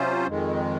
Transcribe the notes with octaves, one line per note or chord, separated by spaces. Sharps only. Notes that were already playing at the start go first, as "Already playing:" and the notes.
Already playing: C3 F#3 C#4 F4 C5
F2 D#3 G#3